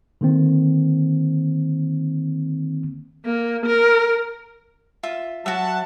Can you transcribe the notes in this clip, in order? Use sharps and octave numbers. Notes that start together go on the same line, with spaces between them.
D3 D#3 A#3 C4
A#3
A#4
F4 E5
F#3 F#4 E5 F#5 A5